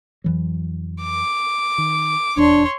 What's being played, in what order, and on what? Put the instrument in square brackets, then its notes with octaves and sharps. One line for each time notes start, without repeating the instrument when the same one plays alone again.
[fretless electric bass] F2 E3 F#3
[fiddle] D6
[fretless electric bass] D#3
[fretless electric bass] D#1 E2 [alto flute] D4 [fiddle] C#5 C6